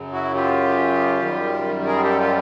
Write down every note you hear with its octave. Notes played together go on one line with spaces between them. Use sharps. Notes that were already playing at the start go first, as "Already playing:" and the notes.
Already playing: F#2 C#3 F#3
E4 F#4
F4 G4
F#2 D#3 G3
G#4 A#4
G4 A4
F4 G4